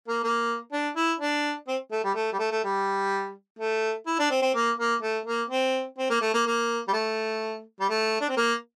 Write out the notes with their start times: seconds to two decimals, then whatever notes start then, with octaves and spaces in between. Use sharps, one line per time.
0.08 A#3
0.23 A#3
0.72 D4
0.96 E4
1.19 D4
1.68 C4
1.91 A3
2.04 G3
2.15 A3
2.32 G3
2.39 A3
2.51 A3
2.64 G3
3.59 A3
4.07 E4
4.19 D4
4.30 C4
4.42 C4
4.55 A#3
4.78 A#3
5.02 A3
5.26 A#3
5.50 C4
5.99 C4
6.10 A#3
6.21 A3
6.34 A#3
6.46 A#3
6.88 G3
6.93 A3
7.80 G3
7.90 A3
8.20 D4
8.29 C4
8.37 A#3